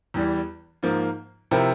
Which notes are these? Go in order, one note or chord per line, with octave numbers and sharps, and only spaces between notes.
E2 E3 G3
G#2 F3 A#3
C3 F3 C4 E4 A#4